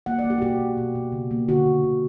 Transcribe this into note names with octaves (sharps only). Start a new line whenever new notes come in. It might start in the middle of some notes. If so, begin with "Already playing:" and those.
A#3 F#5
D5
A#3
G4
F#4
B2 G4
B2
B2
B2
C#3
A#3
D3 F#4
D3
D3